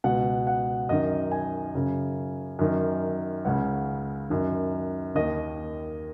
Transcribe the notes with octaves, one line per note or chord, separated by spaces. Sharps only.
C#2 B2 F#5
F#5
F#2 D#3 D#5
G#5
F#2 C#3
F#2 D#3
C#2 C#3 F#5
F#2 D#3
D#2 D#3 D#5